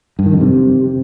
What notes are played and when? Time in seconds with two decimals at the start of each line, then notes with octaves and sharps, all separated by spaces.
0.19 G2
0.26 D#3
0.33 F2
0.41 C3